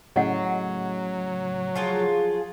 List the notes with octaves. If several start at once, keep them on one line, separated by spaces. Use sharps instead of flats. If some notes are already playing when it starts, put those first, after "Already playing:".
A2 C#3 F#3 C#5 D#5 F#5
F3 F4 G#4